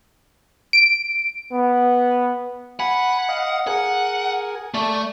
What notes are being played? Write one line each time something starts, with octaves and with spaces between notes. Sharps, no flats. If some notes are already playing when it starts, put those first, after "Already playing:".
D7
B3
F#5 G#5 B5
D#5 F5
G#4 A#4 F#5 G#5
A3 D5 A5